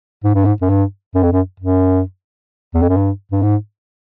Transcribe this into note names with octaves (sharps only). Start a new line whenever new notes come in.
G#2
G2
G#2
F#2
G2
F#2
F2
F#2
F#2
E2
F2
F#2
G2
G2
G#2